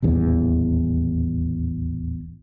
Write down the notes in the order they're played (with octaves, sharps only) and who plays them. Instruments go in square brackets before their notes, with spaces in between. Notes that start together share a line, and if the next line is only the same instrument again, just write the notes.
[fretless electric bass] D#1 A1 E2